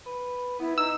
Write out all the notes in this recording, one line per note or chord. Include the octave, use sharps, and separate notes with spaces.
B4
B3 E4
D#4 E6